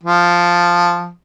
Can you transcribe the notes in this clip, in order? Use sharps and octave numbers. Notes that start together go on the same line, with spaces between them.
F3